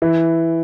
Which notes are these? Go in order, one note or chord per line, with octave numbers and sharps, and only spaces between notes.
E3